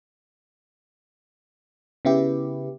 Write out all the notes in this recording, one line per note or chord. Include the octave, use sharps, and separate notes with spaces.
C#3 B3 E4 G4